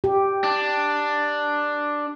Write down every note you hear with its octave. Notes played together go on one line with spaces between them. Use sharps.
G4
D4